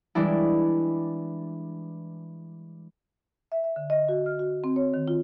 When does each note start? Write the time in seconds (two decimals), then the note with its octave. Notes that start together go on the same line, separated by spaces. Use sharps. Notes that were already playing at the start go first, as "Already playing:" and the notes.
0.15 E3 G3 G#3 D4 E4
3.52 E5
3.64 E5
3.76 D3
3.90 D#5
4.09 F#4
4.26 F6
4.39 F#4
4.64 C4
4.76 C#5
4.94 D#3
5.08 F4